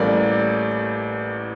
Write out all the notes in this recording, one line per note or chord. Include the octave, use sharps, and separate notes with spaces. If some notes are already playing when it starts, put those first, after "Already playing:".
Already playing: A1 A2 G3 A#3 D5